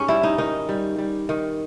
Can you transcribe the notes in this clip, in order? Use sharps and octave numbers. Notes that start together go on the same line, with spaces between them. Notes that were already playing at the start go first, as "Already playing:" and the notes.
Already playing: G#2 C#4 G4
G3 E4
D#4
D#3 D#4
G3
G3
D#3